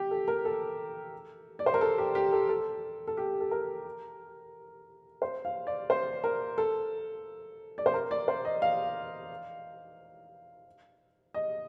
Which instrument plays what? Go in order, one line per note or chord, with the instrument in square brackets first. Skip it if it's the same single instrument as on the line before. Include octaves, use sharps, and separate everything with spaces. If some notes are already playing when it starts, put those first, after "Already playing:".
Already playing: [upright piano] G4
A4
A#4
A4
D5
C5
A#4
A4
G4
G4
A4
A4
A4
G4
A4
A#4
C5
F5
D5
C5
A#4
A4
D5
C5
A#4
D5
C5
D#5
F5
D#5